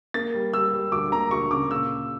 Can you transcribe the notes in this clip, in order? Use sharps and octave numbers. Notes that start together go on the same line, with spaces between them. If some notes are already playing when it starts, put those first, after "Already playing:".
A#3 A6
G3
G3 E6
G3
D2 D6
A#3 A#5
D2 C#6
C#3 D6
A#2 E6